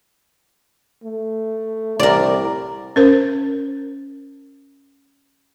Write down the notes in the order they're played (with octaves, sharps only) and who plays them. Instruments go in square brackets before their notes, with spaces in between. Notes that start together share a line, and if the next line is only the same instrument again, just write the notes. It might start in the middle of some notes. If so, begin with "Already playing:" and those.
[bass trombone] A3
[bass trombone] C2 [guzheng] A#4 D5
[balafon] C#4 A#4 C5